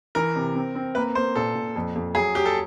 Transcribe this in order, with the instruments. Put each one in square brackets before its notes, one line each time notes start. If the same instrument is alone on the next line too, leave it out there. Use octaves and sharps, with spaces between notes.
[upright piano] E3 [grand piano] A#4
[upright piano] C3
C4
C4
[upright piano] A#3 [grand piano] B4
[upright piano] A#3 [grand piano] C5
[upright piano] A#2 [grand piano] A4
[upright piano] A#2
F2
F2
[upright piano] F#3 [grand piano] G#4
[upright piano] F#3 [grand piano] G4
[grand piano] A4